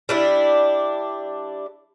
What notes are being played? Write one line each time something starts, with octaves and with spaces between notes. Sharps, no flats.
G3 D4 E4